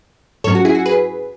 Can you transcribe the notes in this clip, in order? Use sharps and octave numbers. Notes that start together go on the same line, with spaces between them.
G#2 F#3 C#4 A4 C#5
F#4
E4 G#4
F#4
G#4 B4